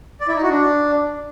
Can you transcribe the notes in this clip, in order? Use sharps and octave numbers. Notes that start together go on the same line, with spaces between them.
D5
E4
D#4
F#4
D4